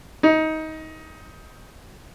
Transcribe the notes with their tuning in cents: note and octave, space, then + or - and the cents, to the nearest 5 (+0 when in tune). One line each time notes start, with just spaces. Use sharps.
D#4 +20